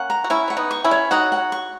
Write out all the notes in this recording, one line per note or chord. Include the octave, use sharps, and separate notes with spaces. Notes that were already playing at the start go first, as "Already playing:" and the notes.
Already playing: A#3 C#4 F#5
A#5
F#4
C#4 E4 C#6
C#4 F#5
B3 D#4
C#6
C#4 E4
C#5
D#4 F#4 F#5
F#5
C#6